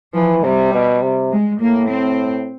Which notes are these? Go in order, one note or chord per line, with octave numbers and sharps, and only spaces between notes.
E3 F3
C3 G3
B2
C3
G#3
A2 A#3
C4